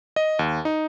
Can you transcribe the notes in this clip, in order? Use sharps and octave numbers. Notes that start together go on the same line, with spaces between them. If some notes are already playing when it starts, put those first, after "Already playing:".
D#5
D#2
D#4